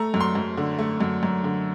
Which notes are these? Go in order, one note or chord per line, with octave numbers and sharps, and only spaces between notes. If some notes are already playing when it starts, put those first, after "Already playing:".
Already playing: A3 A#5
F#2
C6
F#2
D3
A3
F#2
F#2
D3